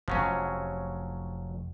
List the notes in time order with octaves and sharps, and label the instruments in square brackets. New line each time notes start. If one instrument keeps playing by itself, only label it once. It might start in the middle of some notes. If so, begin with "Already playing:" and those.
[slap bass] F1 [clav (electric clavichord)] F3 F#3 C#4